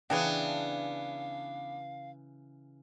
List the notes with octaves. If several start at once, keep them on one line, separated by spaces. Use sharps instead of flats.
C#3 E3 B3 D4 C#5 F5 G5